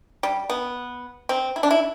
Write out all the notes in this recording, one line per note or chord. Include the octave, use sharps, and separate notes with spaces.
G3
B3
C4
E4
D4
E4